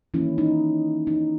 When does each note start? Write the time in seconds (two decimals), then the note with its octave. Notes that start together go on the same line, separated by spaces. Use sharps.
0.14 D#3 E3 G3 A#3 C#4 E4
0.38 D#4
1.07 D#4